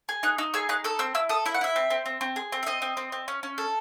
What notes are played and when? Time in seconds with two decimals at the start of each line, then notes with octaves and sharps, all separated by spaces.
0.09 G#4
0.23 D#4 F#6
0.38 D#4 E6
0.54 G#4 E6
0.69 D#4 F#6
0.84 A4 E6
0.99 C4 E6
1.15 E4 E6
1.29 A4 D#6
1.46 E4 E5
1.54 F#5
1.61 E4 E5
1.76 C4
1.90 C4
2.06 C4
2.21 C4
2.36 G#4
2.52 C4
2.63 E5
2.66 C4 D#5
2.82 C4
2.97 C4
3.12 C4
3.28 C#4
3.43 C#4
3.58 A4